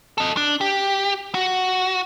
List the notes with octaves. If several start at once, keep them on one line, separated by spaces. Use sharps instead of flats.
A4 D#5
D4
G4
F#4